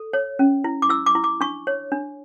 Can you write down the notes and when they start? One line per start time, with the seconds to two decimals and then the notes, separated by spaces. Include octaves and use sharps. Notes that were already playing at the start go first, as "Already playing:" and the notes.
Already playing: A4
0.13 C#5
0.39 C#4
0.64 E4
0.82 D6
0.89 E4 E6
1.06 D6
1.15 E4
1.24 D6
1.41 D4 C#6
1.67 C#5
1.92 D4